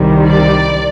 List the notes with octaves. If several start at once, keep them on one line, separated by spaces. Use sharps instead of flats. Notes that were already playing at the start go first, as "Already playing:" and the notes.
Already playing: C2 C3 D#3 G3
D5